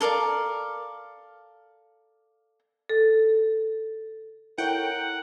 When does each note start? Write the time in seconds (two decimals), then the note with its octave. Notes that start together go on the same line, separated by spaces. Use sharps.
0.01 A4 A#4 D5 F5
2.89 A4
4.58 E4 A4 A#4 C#5 F#5 G5